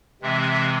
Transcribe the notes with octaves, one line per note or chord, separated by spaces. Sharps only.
C3 E3 G#3 C4 E5